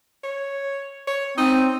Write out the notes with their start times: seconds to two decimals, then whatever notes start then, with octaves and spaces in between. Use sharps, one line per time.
0.24 C#5
1.07 C#5
1.38 C4 D#4